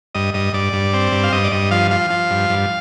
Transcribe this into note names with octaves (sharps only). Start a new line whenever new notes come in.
G2 D#5
G2 D#5
G2 D5
G2
C4
G2
F5
G2 D#5
D5
G2 D#5
F3 F5
F3 F5
F3
G2
G2